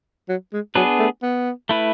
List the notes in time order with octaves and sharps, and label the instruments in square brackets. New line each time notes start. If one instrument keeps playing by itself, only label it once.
[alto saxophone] F#3
G#3
[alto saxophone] F#3 [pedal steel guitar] B3 D4 G#4 B4
[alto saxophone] A3
B3
[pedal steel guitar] A3 E4 B4